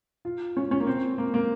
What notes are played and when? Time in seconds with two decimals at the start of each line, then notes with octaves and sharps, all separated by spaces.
0.25 F4
0.57 C#4
0.71 C#4
0.80 A#3
0.87 C4
1.18 A#3
1.34 A#3